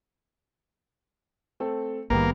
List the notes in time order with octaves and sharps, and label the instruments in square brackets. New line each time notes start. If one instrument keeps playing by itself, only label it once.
[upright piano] A3 C4 A4
[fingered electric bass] A#1 G#2 D#3 [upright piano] G3 B3 A#5 [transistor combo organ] A#3